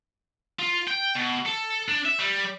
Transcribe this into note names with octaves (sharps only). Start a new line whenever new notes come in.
F4
G5
B2
A4
D4
E5
G3